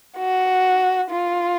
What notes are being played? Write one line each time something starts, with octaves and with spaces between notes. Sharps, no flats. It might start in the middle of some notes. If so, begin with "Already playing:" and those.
F#4
F4